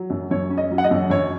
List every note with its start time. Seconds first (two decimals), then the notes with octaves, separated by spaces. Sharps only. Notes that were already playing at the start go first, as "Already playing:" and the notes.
Already playing: F#3
0.10 F#2
0.31 F#2 C#5
0.50 C#4
0.58 D#5
0.71 F#3
0.78 F#5
0.84 D#5
0.91 F#2
1.10 F#2 C#5